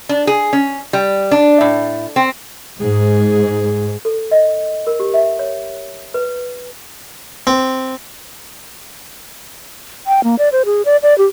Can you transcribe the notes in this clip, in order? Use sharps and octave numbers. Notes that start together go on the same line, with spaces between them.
D4
G#4
C#4
G3
D4
A2
C4
G#2 G#4
A4
D#5
A#4
G4
E5
C#5
B4
C4
G5
A#3
D5
C5
G#4
D5
D5
G4